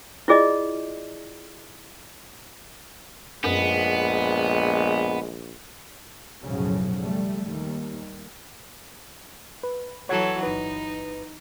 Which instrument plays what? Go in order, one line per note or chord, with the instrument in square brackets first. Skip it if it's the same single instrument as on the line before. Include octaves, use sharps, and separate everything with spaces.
[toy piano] E4 F4 G#4 D5 D#5
[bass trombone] A#1 [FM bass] F#2 [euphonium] G#3 [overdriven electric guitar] B3
[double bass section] B1 F#2 A2 C#3 F3 F#3
G3 A3
D#2 G3
[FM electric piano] B4
[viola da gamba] E3 F#3 A4 [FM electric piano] C#5 F#5 G#6
[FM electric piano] G1 B4 [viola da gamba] D#4